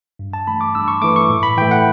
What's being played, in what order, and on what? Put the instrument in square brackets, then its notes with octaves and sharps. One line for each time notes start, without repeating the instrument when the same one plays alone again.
[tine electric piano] G2
A5
E3 A3 B5
D6
G2 E6
C#6
E3 A3 D6
C#6
A2
B5
E3 A3 G5
F#5